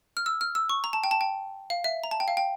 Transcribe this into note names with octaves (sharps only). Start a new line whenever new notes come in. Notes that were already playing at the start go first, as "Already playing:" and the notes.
F6
E6
F6
E6
C#6
A#5
A5
G5
A5
G5
F5
E5
A#5
A5
G5
F5
G5